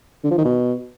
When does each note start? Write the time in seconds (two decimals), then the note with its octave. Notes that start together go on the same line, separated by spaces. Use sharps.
0.24 D3
0.31 F3
0.38 D#3
0.45 B2